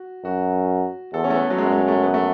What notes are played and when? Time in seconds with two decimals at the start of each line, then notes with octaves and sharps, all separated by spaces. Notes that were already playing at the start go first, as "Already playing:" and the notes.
Already playing: F#4
0.24 F#2 F#4
1.13 E2 A4
1.24 C#4
1.30 A3
1.36 B3
1.50 F#3
1.58 F#2 G#3
1.72 G#3
1.88 A3
2.03 B3
2.14 A3